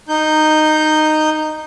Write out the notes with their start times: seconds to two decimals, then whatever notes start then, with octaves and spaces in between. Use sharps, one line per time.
0.09 D#4 G6